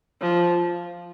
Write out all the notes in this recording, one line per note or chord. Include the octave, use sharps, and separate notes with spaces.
F3